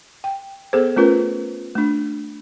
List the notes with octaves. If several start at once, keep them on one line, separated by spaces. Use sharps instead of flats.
G5
B3 G#4 A4 C5
A3 C#4 F4 A#4 B4
A3 D4